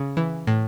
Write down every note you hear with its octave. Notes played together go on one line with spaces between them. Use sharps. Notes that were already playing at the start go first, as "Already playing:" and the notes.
Already playing: C#3
E3
A2